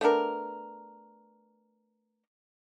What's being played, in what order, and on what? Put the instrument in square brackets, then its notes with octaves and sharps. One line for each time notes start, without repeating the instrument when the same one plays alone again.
[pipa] A3 B3 D4 A#4